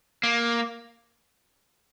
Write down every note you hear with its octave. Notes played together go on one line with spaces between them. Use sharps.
A#3